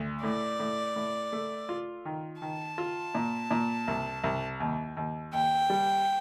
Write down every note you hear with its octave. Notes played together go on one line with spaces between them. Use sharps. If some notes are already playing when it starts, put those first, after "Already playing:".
Already playing: D2
A2 D5
A2
A2
A3
F4
D#3
D#3 A5
F4
A#2
A#2
C2
C2
D#2
D#2
D#2 G5
G3